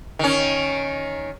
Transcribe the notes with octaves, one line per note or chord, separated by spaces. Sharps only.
D#3 C#4